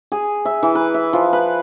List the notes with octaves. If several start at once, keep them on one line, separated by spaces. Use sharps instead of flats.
G#4
E5
E3
B4
E5
F3
B4